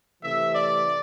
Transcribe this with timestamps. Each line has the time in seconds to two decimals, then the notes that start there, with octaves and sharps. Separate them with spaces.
0.22 C3 E3 A3 E5
0.54 D5